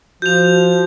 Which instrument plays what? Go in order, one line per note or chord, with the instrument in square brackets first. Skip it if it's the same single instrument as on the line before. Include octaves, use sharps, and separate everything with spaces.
[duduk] F3 [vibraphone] F#4 [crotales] G6 F7